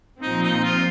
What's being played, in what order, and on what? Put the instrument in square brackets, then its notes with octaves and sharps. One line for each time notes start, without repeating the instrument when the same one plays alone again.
[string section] A#2 F3 C4 [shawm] D#4
[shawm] D#4
F4